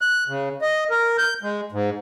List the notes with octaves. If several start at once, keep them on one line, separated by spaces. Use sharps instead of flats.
F#6
C#3
D#5
A#4
G6
G#3
G#2